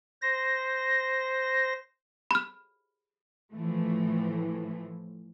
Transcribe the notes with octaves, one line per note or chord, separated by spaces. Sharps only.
C5 A#6
B5 F6
A2 E3 F3 A3